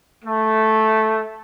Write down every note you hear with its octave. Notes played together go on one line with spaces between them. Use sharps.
A3